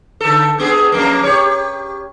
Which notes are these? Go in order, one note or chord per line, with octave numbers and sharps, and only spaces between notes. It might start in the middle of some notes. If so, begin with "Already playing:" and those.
D3 A4
G2 B3 G#4
F2 A#3
G4 C#5